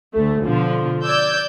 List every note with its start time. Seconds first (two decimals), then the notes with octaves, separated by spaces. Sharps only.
0.14 D2 A3
0.44 B2 D3 F3
1.05 D5 E6 G6 G#6